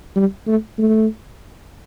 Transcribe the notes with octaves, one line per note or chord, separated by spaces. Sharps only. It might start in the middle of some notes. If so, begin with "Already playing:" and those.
G3
A3
A3